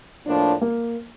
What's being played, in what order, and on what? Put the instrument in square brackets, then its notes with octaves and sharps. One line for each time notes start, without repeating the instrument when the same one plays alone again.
[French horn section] A2 F3 A#3 D4
[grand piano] A#3